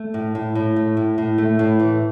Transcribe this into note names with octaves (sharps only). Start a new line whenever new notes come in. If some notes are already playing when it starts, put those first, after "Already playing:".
Already playing: A3
A2
A2
A2
A3
A2
A2
A3
A2
E3